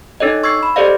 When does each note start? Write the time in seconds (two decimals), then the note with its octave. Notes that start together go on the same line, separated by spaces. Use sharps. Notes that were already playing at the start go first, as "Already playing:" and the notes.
0.20 D4 D#4 A4 C#5 D#5
0.43 C#6 E6 G#6 A6 C7
0.63 B5
0.76 G4 A4 C5 D5 D#5 F5